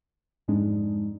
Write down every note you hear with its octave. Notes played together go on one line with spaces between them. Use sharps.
F2 G#2 G#3 D4 D#4